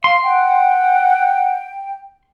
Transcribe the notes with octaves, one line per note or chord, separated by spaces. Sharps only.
F5 C6
F#5 G5